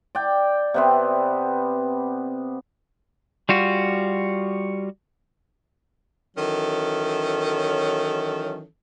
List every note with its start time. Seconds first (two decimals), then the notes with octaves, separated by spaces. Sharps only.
0.15 D5 G5
0.74 C3 B3 C4
3.49 G3 F4 F#4
6.37 D#3 E3 F#3 C#4 A4